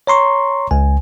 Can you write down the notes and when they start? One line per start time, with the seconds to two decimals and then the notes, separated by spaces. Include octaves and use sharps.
0.07 C#5 A#5 C6 C#6
0.71 C#2 G#5